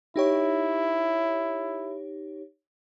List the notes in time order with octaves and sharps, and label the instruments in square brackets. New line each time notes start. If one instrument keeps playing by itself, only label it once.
[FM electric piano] D#4 G4 C#5 [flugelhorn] E4